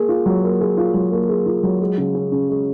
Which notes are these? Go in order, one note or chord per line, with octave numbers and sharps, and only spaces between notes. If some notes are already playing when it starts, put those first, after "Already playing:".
Already playing: A#3 G#4
F4
F#3
A#3
G#4
F4
F#3
A#3
G#4
F4
F#3
G#3
C#3
C#4
C#3
G#3